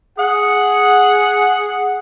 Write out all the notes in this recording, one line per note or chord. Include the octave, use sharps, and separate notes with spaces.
G#4 F#5